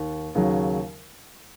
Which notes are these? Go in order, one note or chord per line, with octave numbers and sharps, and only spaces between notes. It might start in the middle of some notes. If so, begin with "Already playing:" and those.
Already playing: D#2
D#2 C#3 F#3